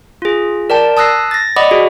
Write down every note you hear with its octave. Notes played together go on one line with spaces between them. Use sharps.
F4 G#4
A#4 D5 G5 A5
A5 D#6 E6 F#6 A#6 C7
A6 A#6
D5 D#5 F#5 B5 D6 D#6
F#4 G#4